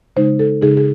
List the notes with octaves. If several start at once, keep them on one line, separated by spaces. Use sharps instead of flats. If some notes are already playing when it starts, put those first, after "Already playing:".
C#3 G#3 D#4 C5
A4
C#3 G#3 D#4 G#4
G#4